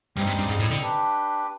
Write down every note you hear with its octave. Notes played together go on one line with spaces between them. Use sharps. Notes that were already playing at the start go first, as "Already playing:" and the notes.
G2 G3 C4 D#4
G2
G2
G#2
A2
D3
D4 G4 B4